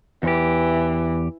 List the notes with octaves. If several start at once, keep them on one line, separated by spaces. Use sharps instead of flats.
E2 E3 G4